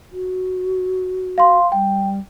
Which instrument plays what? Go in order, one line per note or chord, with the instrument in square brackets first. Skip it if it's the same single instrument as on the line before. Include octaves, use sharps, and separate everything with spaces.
[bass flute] F#4
[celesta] F5 C6
[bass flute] G3 [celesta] G5